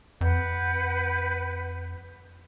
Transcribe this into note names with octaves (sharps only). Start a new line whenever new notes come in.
F2 B4 F#5 G6